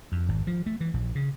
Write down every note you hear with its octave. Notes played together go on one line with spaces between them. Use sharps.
F2
G#1
F3
A3
E3
A#1
C#3